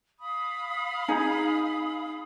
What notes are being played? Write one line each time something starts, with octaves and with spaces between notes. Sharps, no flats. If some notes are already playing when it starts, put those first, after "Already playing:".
F5 B5 D#6
D#4 G#4